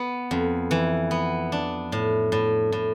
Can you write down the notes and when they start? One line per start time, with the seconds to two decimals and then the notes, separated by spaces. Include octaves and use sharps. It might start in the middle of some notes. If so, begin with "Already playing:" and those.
Already playing: B3
0.31 F2
0.71 E3
1.11 B3
1.52 D4
1.92 A2
2.32 A2
2.72 A2